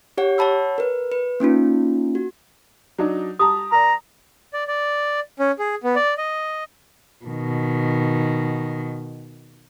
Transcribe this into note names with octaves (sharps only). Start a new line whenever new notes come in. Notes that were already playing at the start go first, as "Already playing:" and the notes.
G4 C#5 F#5
C#5 F#5 A5 B5 E6
A#4 B4
B4
A#3 C#4 D#4 F4
F#4
F#3 D4 D#4
G4 A5 A#5 D#6
A#4 D5 A#5
D5
D5
C#4
G#4
B3
D5
D#5
B2 D#3